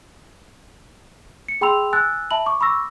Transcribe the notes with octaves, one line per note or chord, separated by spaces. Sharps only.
C#7
G#4 G5 B5 C6 E6 F7
G#5 E6 F#6 A6
E5 A5 B5 F#7
C#6 D6
B5 C#6 D6 E6 A#6